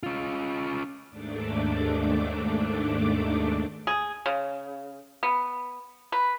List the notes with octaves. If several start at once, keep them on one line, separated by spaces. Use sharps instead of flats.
C#4 F4
D#2 G#2 A3 D4 D6
G#4
C#3
B3
B4